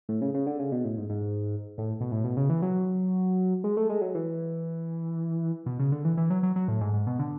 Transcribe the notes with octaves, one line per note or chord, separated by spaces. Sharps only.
A2
C#3
C#3
D3
C#3
B2
A2
G#2
G#2
A2
B2
A2
B2
C#3
E3
F#3
G#3
A3
G#3
F#3
E3
B2
C#3
D3
E3
E3
F#3
F#3
F#3
A2
G#2
G#2
B2
D3